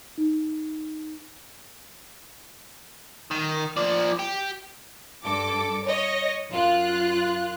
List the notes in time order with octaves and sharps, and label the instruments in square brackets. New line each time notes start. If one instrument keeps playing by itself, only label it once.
[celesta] D#4
[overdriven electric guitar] D#3
F3 D5
G4
[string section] G2 A4 D6
C#5 D#5
F#2 F4 F#6